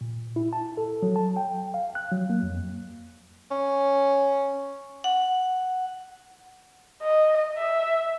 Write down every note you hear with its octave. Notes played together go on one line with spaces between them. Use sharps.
A#2
E4
A5
A4
F#3
A5
G5
F5
F#6
F#3
A#3
F2
C#4
F#5
D#5
E5